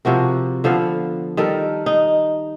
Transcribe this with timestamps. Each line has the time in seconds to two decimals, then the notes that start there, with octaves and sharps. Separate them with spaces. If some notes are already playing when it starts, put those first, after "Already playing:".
0.05 C3 F3 F#4 A#4
0.64 D3 F3 B3 F5
1.37 D#3 G3 A4 A#4
1.86 D#4